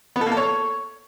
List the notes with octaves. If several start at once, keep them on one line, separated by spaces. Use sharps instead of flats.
B3
A4
A#3
A4
C#5